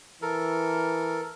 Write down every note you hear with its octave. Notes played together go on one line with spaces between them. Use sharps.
E3 A4 A#4